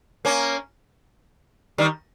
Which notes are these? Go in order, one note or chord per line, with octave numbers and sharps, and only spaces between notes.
A#3 C#4
D#3 G3